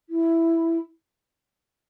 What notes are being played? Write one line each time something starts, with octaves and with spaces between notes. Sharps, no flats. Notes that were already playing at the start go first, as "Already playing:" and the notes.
E4